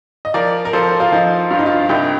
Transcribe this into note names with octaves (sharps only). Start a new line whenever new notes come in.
D#5
F3 A#4 D5
A#4
F3 A4 C5
F4
F3 D#4
G2 F4
D#4
F4
C2 D#4 G4